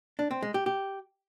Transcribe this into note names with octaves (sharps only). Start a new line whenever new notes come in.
D4
C4
G#3
G4
G4